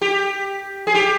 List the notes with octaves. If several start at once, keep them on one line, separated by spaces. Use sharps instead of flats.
G4
G#4
G4